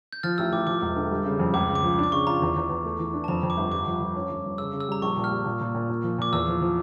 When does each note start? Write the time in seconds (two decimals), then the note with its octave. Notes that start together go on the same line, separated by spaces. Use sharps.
0.13 G6
0.23 F3 F6 A6
0.38 A1 E6
0.52 A1 D6
0.67 F3 D6
0.81 E1
0.96 D3
1.11 G3
1.25 C#3
1.39 F2
1.54 C#2 D6
1.69 C#3
1.75 D6
1.82 F3
1.98 D4
2.04 D6
2.12 C#3 C#6
2.26 F4 A#5
2.42 E2
2.56 E2
2.70 E2
2.85 A3
2.99 E3
3.13 D4
3.24 A5
3.28 F2 A#5
3.43 F2
3.50 D6
3.57 G1
3.72 G2 D6
3.87 F3
4.00 F3
4.16 C#4
4.30 G1
4.45 G1
4.58 C#3 E6
4.73 C#3
4.80 E6
4.88 G3 A#5
5.02 A#1 C#6
5.16 A#2
5.24 F6
5.31 G3
5.45 A#2
5.61 A#2
5.75 A#2
5.89 A#2
6.04 F3
6.18 A#2 D6
6.32 E2 E6
6.47 F3
6.61 F3